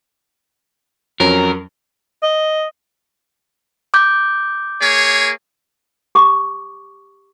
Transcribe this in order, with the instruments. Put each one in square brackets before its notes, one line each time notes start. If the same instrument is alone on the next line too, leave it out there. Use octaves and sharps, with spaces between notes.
[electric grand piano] F2 F#3 C#4 [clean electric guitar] A#4
[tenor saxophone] D#5
[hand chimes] D6 G6
[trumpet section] A#3 G#4 C#5
[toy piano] G4 C#6 D6